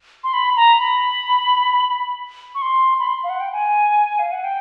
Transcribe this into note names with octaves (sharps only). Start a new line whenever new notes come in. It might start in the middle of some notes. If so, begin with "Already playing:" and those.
C6
B5
A#5
B5
C#6
C6
B5
C6
F5
F#5
G5
G#5
F5
F#5
G5